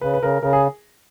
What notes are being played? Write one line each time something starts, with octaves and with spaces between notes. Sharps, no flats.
C#3 B4
B4
C#3 A#4
C#3 A#4
G#4